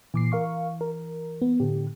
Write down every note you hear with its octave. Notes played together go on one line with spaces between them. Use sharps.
A#2 E3 D6 C7
A#4 F5 C#6
A#4
B3
A2 D3 G4